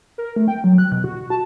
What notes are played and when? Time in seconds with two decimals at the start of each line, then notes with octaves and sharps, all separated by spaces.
0.18 A#4
0.36 A3
0.48 G5
0.64 F#3
0.78 F#6
0.92 B2
1.04 F#4
1.16 F#4
1.30 A5